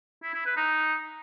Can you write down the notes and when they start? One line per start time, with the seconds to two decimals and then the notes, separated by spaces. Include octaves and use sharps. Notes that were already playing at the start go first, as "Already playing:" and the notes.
0.23 E4
0.34 E4
0.45 B4
0.57 D#4